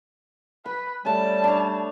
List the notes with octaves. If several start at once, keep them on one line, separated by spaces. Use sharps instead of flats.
B4 B5
G3 A3 C#4 A5
D4 C#5